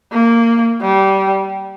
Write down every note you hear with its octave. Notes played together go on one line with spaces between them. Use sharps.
A#3
G3